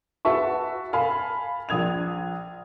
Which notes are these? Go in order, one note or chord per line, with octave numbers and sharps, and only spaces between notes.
F#4 G#4 B4 E5 A5 C#6
F5 G#5 A5 B5
A#1 D#6 G#6 F7